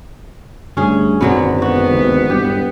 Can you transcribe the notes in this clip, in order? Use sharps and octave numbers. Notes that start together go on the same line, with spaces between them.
G1 D2 G2 C#4 G#4
G#1 F#2 A#2 D3 F#3 G#3 B3
B3 F#4
D2 C3 D#3
E1 G2 G4